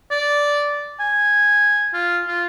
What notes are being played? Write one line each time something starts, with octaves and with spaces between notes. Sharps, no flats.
D5
G#5
F4
F4